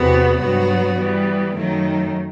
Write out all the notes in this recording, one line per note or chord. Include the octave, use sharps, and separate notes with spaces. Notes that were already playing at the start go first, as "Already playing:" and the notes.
Already playing: E2 C3 E3 B3 F#4
G2 F#3 B3 F#4
E3 G3 B3
F#2 D#3 F#3 A3 D#4